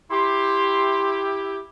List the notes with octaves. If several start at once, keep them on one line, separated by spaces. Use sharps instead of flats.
E4 G4 C6